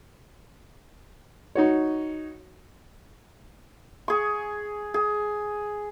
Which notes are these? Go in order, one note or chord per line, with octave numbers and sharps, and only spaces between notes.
D#4 F#4 C#5
G#4 C#6
G#4